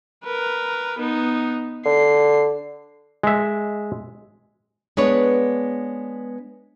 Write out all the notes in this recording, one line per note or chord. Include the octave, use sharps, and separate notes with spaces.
A#4 B4
B3 D#4
D3 C7
G#3 E5
G#3 B3 D4 B4 C#5